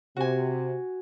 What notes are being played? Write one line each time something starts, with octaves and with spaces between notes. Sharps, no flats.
C3 F#4 G#5